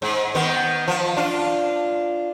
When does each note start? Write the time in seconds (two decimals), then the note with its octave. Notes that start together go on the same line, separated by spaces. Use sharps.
0.02 G#2
0.35 D#3 B3
0.88 F3
1.17 D4 F4